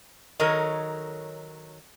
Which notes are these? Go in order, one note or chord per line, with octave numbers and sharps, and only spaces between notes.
D#3 F#3 A4 A#4 C#5 D#5